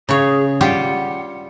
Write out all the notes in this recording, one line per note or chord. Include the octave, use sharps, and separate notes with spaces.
C#3 G#4 C#5
G3 F4 G4 F#5